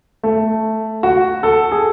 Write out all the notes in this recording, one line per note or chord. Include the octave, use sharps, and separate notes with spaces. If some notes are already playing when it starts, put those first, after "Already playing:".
A3
F#4
A4
G#4